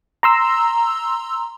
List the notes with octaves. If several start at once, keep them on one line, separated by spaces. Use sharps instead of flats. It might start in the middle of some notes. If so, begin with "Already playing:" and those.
A#5 C6 E6